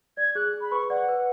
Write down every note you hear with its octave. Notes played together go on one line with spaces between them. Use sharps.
D5 G#6
G#4 F#6
G#4
B5
B4 C#6
D5 F#5
B4